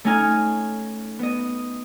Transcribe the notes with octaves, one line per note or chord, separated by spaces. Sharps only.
A3 C#4 D#4 G#5 F6
B3 D#5